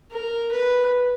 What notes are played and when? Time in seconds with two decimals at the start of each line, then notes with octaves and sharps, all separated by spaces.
0.11 A#4
0.51 B4